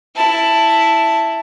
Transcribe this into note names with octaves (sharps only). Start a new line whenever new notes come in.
E4 A5